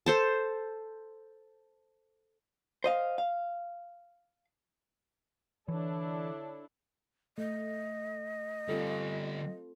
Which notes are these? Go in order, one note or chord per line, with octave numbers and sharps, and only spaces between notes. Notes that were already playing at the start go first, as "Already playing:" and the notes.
A4 C5 A5
C5 D#5 F5
F5
D3 E3 D4 E4 A4 C#5
A3 D#5
D3 G3 C4 F4 A4